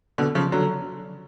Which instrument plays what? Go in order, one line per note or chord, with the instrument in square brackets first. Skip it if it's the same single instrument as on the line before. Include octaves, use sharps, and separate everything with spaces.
[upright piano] B2 D3
C#3 F3
D3 F#3